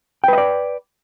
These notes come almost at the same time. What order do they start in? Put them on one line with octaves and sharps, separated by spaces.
G5 B4 D#5 D5